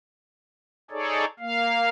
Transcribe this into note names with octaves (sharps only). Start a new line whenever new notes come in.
D#4 G#4 A4 C#5 D5
A#3 F5